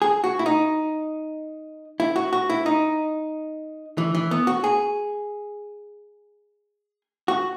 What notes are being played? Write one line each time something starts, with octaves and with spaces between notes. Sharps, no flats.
G#4
F#4
E4
D#4
E4
F#4
F#4
E4
D#4
E3
E3
B3
F#4
G#4
F#4